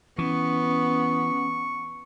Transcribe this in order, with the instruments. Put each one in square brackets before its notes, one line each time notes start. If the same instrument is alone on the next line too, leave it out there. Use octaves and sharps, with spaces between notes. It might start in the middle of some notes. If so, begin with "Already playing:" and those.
[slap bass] E3 [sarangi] B3 [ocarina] C#4 [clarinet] C#6